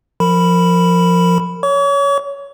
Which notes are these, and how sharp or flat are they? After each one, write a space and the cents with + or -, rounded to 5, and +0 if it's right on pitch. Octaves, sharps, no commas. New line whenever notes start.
F3 +0 A#4 -25 B5 +0
C#5 +15 C#6 +45